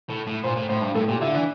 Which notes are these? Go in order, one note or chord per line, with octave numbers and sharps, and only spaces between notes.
A2
A2
A#2 C5
A2
A2 C5
G2
A2 A4
A#2 G4
D3 E4
E3 D4